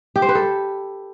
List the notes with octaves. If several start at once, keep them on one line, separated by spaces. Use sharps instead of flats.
G4
C5
B4
A4